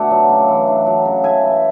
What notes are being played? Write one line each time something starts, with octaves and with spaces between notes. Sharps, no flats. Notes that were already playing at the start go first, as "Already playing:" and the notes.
Already playing: B2 D3 A3 D5 E5 F#5
F#3
C#3
E3
D4
F#3
C#3
G#3 E5 G#5
E3